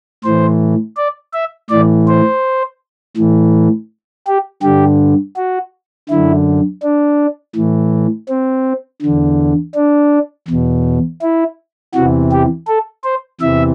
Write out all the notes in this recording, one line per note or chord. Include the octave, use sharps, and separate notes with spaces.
A2 E3 C5
D5
E5
A2 E3 D5
C5
A2 E3
G4
G2 D3 G4
F#4
F#2 D3 E4
D4
A2 E3
C4
E2 D3
D4
E2 B2
E4
E2 C3 E3 F#4
G4
A4
C5
E2 C3 E3 E5